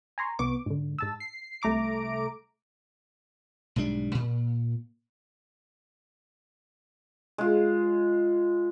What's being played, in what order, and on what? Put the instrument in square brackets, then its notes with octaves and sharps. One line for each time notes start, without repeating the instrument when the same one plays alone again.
[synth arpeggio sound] G#5 A#5 C6 C#6
C2 B3 C#6 D6
G#2 D3
G#2 A5 E6
C7
C2 A3 A#5 D6 D7
[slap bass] B1 G#2 G3 D4
A#2
[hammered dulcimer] G#3 F4